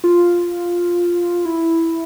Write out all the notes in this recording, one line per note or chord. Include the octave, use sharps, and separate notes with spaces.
F4
E4